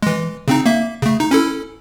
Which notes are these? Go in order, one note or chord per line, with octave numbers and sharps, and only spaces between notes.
E3 G#3
C#3 C4 D#4
A#3 E5
C#3 A3
D#4
C#4 E4 A4